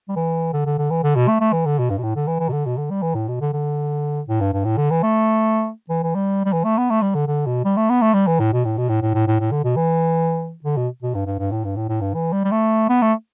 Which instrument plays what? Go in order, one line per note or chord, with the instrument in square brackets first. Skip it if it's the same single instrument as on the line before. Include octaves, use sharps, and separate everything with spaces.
[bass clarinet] G3
E3
D3
D3
D3
E3
D3
B2
A3
A3
E3
D3
B2
G2
B2
A2
D3
E3
E3
B2
D3
B2
D3
G3
E3
A2
B2
D3
D3
A2
G2
G2
A2
D3
E3
A3
E3
E3
G3
G3
E3
A3
B3
A3
G3
D3
D3
B2
G3
A3
B3
A3
G3
E3
A2
B2
A2
B2
A2
A2
A2
A2
A2
D3
B2
E3
D3
B2
B2
G2
G2
G2
A2
G2
A2
A2
G2
E3
G3
G3
A3
B3
A3